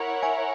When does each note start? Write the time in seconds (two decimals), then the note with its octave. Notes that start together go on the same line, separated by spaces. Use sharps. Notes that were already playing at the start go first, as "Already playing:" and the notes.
Already playing: E4 A#4 C#5 F#5
0.23 E5 G#5